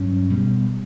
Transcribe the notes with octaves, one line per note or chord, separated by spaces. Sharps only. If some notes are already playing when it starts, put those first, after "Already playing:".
Already playing: G2 F#3 C#4
B2 G3